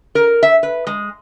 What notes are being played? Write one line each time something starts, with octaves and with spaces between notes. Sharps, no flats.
A#4
E5
B4
G#3